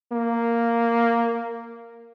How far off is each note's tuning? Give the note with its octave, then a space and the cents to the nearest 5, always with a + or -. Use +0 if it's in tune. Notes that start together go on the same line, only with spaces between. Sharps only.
A#3 -5